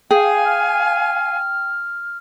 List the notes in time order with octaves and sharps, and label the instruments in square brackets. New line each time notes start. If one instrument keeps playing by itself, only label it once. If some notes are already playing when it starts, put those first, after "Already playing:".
[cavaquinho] G#4 [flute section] F5 G#5 [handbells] G5
[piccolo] F6